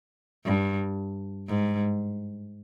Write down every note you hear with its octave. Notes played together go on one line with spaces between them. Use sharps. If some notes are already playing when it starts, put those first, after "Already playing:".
G2
G#2